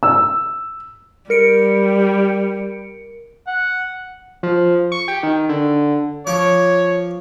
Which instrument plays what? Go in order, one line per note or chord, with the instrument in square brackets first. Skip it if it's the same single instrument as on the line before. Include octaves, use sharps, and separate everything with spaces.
[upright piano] E6
[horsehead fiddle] G3 [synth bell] A#4 C#7 D7
[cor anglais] F#5
[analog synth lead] F3
C#6
G4
D#3
D3
[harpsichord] F3 D6 [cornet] C#5